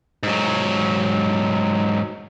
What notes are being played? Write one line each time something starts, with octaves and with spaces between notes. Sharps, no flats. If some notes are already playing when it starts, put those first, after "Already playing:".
G#2 F#3